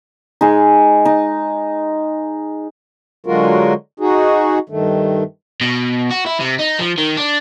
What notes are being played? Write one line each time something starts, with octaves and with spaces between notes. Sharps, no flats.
G#3 D#4
D#4
D3 F#3 G#3 F4 F#4 A#4
D#4 F#4 G#4
G2 D#3 A3
B2
F#4
E4
C3
D#4
F3
D#3
D4